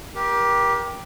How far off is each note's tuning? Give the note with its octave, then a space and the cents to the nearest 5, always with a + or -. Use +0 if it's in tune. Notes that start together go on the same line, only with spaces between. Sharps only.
G4 +0 A#4 +30